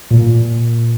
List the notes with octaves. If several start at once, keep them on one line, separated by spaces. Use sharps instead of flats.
A#2